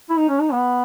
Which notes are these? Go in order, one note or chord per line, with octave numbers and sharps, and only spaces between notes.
E4
D#4
C#4
D#4
B3